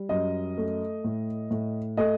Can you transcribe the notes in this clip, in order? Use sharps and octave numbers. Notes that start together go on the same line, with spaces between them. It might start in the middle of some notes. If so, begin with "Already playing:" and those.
Already playing: G3
F#2 D#5
A3
A2
A2
A3 D#5